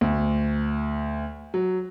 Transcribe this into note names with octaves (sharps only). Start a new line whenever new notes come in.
D2
F#3